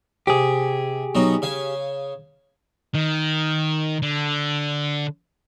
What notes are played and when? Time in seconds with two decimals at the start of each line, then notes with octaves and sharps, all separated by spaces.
0.27 C3 G4 G#4
1.15 B2 F#3 D#4
1.42 C#3 F5 G#5
2.94 D#3
4.02 D3